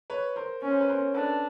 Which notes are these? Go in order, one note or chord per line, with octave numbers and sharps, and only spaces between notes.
B4 C#5
A#4 C5
C#4 C#5
C5
B4
A#4 C5
D4 A4 B4